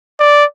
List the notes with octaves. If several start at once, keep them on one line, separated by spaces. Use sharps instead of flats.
D5